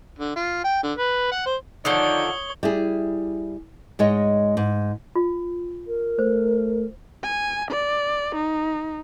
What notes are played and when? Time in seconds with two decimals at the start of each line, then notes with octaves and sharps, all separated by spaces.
0.19 D3
0.36 F4
0.64 G5
0.83 D3
0.97 B4
1.32 F#5
1.46 C5
1.85 D3 D#3 F3 D#4 C#5 D5 D#6 G7
2.63 G3 E4 G#4
3.99 G#2 G#3 C#5 D#5
4.57 G#2
5.16 F4
5.87 A#4
6.19 A3 C5
7.23 G#5
7.71 D5
8.35 D#4